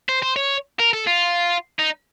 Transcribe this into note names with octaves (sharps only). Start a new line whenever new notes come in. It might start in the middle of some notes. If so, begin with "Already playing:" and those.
C5
C5
C#5
A#4
A4
F4
D#4